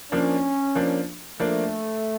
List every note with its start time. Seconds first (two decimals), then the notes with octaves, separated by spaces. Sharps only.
0.11 F3 A#3 C#4 D4
0.75 F3 A#3 D4
1.40 F3 A3 A#3 D4